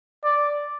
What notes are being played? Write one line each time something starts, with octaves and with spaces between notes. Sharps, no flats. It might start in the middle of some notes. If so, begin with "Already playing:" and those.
D5